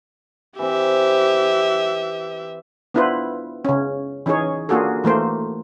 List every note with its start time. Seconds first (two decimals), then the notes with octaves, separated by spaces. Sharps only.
0.59 E3 C4 G4 E5
2.94 B3 D4 E4 F4 B4 C5
3.65 C#3 C#4
4.26 E3 C#4 D#4 G#4 C#5
4.69 A#3 D4 F4 F#4 G#4 A4
5.04 E3 A3 A#3 C5